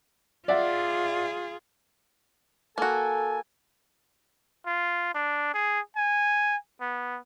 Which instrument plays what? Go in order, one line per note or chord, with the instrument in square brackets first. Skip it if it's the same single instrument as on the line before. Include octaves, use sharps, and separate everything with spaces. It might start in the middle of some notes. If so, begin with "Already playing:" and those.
[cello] F4 G#4 [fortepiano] D5 E5 F#5
[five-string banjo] A#3 F#4 [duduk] A4 [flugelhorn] G#5
[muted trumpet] F4
D4
G#4
G#5
B3